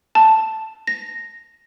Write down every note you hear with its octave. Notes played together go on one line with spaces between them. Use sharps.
A5
A#6